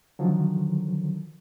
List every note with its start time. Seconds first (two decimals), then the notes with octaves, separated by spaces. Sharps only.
0.19 D3 D#3 F3 F#3